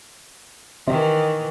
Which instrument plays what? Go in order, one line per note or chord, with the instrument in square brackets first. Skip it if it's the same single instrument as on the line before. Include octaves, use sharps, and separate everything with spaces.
[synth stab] C3 [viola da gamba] D#3 E3